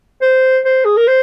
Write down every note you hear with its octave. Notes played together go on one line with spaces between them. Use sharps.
C5
C5
G#4
A#4
C5